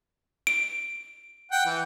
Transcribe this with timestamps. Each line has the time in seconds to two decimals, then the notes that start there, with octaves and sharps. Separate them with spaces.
0.47 D7
1.52 F#5 G5
1.66 E3